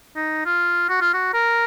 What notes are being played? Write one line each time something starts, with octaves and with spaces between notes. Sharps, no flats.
D#4
F4
F#4
F4
F#4
A#4